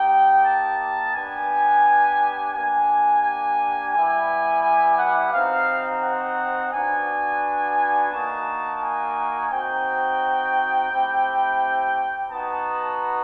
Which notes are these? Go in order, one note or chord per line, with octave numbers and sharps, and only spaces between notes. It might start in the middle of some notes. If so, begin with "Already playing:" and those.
Already playing: A#3 D#4 G4 G5
A5
B3 D4 G4 G#5
A#3 D4 G4 G#5
G#5
G3 B3 E4 G4 G#5
G#5
F#5
C4 D#4 F#4 F5
F#5
B3 D4 F#4 G#5
A#3 D#4 F#4 A5
G#5
C4 D#4 F#4 G5
A3 C4 E4 G4
B3 D#4 F#4 A5